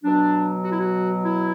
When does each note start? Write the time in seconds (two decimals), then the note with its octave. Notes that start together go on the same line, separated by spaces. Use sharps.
0.03 B2 F#3 D4
0.64 F#4
0.71 E4
0.78 F#4
1.23 E4